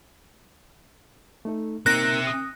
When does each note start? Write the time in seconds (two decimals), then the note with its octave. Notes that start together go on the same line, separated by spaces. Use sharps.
1.45 A3 D#4 A4
1.86 A#3 C4 D#4 A#4 E5 F#6 A#6
2.27 D#6